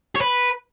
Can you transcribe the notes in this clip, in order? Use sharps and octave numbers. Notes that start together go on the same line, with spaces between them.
C#5
B4